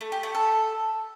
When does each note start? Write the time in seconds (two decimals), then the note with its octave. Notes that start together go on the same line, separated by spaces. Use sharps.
0.01 A3
0.12 G4
0.23 A3
0.35 A4